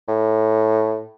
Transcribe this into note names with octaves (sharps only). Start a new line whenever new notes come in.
A2